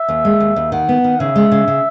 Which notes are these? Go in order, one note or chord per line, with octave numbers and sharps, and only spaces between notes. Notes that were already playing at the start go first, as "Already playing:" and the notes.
Already playing: E5
D#2
G#3
D#2
D#2
D#3 F#5
B3
D#3
C#3 E5
G#3
C#3
C#3